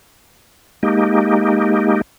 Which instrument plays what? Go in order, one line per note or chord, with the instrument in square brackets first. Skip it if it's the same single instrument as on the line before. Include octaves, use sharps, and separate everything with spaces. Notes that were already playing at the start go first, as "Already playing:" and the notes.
[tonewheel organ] G#3 A#3 D#4 G4